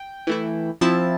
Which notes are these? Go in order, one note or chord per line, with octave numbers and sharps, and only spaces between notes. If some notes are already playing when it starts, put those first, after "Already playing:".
Already playing: G5
E3 A3 E4
F3 C4 E4 A5